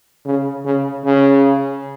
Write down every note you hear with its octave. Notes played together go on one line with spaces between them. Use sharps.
C#3
C#3
C#3